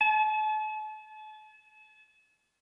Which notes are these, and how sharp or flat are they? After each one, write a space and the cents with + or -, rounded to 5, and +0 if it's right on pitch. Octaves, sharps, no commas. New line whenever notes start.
A5 -40